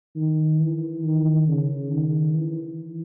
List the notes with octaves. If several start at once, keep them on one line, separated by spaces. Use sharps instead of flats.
D#3
E3
D#3
C#3
D#3
E3